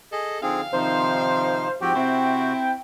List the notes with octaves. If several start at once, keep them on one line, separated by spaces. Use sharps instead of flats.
G#4 A4 D#5
D3 F3 C4 D#4 G#4 F5
C3 D#3 F3 C4 D#4 C5
G#2 F3 C4 F#4 G4 G5
C3 C4 E4 F#4